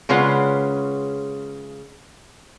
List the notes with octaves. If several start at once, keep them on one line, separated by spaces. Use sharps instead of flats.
C#3 G#3 C#4 F4 B4 F#5